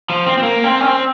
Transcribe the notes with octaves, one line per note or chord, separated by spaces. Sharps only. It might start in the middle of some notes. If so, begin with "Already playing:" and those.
F3
C4
C4
A#3
C4
C#4
C4